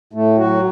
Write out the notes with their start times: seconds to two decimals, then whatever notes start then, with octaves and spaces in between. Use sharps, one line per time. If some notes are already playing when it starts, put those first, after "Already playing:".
0.13 A2 A3
0.38 F#3 F#4